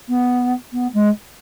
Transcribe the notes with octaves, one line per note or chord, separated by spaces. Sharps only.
B3
B3
G#3